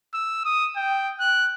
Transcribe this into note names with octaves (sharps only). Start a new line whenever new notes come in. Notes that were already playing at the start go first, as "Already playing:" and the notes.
E6
D#6
G5
F#6